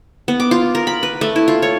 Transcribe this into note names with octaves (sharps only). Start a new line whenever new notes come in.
B3
D6
F4
A#4
B5
B4
A3
E4
F4
C#5